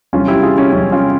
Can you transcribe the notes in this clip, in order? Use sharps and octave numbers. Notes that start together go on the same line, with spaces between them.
E2 C3 G3 C#4 F4
E4 G4
F4 G#4
C#4
E2 C3 G3 C#4
C#4 F4